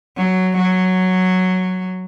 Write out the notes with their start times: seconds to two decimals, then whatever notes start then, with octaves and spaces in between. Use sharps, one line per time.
0.17 F#3
0.57 F#3